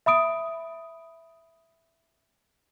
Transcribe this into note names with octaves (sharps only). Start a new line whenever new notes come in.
E5 B5 D#6 D7